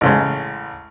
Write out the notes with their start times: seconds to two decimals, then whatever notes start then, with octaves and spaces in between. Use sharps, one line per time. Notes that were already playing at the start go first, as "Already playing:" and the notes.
0.01 A1 C#3 G#3